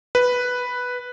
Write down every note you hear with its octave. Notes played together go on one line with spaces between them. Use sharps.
B4